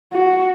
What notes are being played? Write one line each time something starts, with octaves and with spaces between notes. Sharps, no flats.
F#4